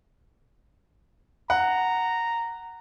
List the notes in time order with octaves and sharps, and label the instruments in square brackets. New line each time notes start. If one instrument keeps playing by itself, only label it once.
[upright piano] F#5 [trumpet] A#5